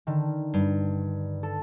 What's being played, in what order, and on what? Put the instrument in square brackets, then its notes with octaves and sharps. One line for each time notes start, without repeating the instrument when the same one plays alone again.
[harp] D3 D#3
[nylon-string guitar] G2
[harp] A4